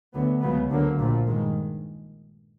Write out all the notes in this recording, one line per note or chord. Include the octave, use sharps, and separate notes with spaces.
D2 D3 F#3 B3
C#2 C#3 F#3 B3
D2 D3 F#3 A#3
A#1 A#2 F3
G2 D#3 G#3